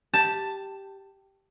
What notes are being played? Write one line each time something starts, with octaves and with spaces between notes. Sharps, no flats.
G4 A5